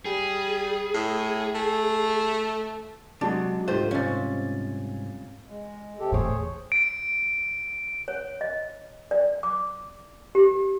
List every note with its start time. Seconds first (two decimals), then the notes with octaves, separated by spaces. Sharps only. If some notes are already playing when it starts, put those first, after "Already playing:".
0.05 G3 G#4
0.94 A2
1.55 A3
3.21 C3 F#3 G#3 D4 F#4
3.68 C2 G#2 D#4 F4 G4 A4 C5
3.91 C3 C#4 F5 G#5 A6
5.47 G#3
5.99 C3 G4 A4
6.12 E2 A2 G#4 C5 C#5
6.72 D7
8.08 C#5
8.41 D#5
9.11 D5
9.43 D6
10.35 G4